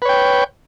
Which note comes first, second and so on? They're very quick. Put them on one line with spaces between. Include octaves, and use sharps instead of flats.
B4 C#5 G5